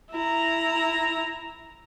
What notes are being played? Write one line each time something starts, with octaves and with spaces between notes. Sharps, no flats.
E4 A#5